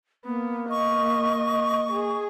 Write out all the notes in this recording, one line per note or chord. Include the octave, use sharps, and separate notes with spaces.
A#3 B3
D#5 C#6
G#4